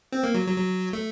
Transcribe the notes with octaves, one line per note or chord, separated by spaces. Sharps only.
C4
A#3
F#3
F#3
F#3
A3